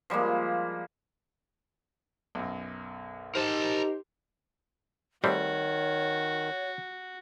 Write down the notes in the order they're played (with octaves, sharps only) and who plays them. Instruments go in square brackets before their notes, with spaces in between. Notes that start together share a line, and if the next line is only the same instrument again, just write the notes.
[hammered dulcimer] F3 G3 G#3 A#3
[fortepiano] B1 F#2
[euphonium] D#4 [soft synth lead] G4 [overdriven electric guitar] A#4 A5 [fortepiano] C5
[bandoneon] D#3 [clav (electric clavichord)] G3 A3 C4 [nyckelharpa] F#4 [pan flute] C#5